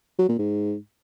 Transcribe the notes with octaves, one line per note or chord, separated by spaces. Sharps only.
F#3
A#2
G#2